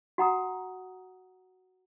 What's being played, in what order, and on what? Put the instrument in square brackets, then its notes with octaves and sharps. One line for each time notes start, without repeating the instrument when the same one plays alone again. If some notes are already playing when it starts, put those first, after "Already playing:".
[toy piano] F#4 F#5 A#5 D#6